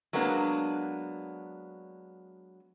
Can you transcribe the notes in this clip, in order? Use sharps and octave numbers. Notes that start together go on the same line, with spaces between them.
F#3 G#3 A#3 B3 D4